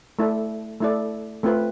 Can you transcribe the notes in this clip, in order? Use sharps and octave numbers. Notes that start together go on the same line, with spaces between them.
A3 E4 A4 D5
A3 E4 A4 D5
A3 C4 F4 B4